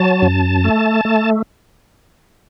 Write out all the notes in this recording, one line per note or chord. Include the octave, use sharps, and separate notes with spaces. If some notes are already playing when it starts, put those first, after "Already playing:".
Already playing: F#3 A5
F#2
A3
A3